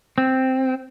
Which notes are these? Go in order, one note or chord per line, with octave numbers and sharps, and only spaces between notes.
C4